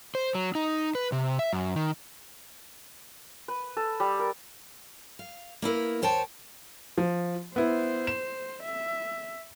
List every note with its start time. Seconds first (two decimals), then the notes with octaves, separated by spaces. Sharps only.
0.15 C5
0.35 F#3
0.55 D#4
0.95 B4
1.12 C3
1.39 E5
1.53 F#2
1.76 D#3
3.48 B4
3.77 A4
4.00 G3
4.19 A#4
5.19 F5
5.62 A#3 B3 E4 A#4
6.02 D#2 C5 C#5 G5 A5
6.98 F3
7.56 B3 E4 C5
8.07 E7
8.63 E5